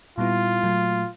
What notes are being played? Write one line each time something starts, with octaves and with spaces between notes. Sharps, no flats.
A#2 G3 B3 E4 F4
A#2 F#3 A3